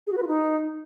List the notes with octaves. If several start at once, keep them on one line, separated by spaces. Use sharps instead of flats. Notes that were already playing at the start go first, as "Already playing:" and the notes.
G#4
F#4
B4
F4
D#4